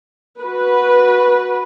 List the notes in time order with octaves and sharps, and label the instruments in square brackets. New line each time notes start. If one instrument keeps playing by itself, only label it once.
[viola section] F#4 B4